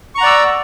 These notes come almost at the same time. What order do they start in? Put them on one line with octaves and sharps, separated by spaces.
C#6 A#5 F#5 D5 E6